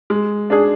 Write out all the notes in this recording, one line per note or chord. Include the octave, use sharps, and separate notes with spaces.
G#3
D4 G#4